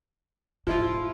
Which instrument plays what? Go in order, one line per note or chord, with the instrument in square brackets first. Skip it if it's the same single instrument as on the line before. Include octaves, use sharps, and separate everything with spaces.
[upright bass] G#2 [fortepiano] F3 E4 F4